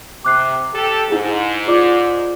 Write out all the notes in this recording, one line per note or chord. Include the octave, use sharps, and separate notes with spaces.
C3 D6 F#6 C7
G4 A4
G#2 D#4 E4 G#4
F4 D5 D6